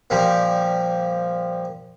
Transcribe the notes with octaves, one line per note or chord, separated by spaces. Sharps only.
A#2 F3 G3